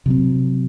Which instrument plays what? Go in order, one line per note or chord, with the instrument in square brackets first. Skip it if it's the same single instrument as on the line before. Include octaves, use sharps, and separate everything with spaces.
[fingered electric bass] C3 F#3 C4